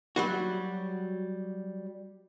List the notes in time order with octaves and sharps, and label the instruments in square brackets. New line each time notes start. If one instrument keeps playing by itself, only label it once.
[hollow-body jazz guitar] F#3 G3 F#4